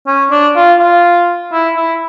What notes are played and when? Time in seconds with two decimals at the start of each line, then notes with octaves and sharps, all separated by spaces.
0.07 C#4
0.31 D4
0.56 F4
0.79 F4
1.52 E4
1.77 E4